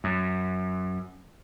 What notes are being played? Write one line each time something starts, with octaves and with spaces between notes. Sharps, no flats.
F#2